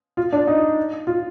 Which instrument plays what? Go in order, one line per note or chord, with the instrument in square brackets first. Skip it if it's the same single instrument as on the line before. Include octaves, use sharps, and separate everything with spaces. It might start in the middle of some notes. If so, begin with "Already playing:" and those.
[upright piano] F4
D4
D#4
F4